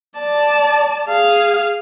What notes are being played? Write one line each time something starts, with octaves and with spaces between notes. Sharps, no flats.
D5 A5
G#4 F5